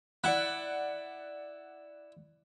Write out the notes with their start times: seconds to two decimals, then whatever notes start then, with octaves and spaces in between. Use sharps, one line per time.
0.24 E4 D5 F#5 F#6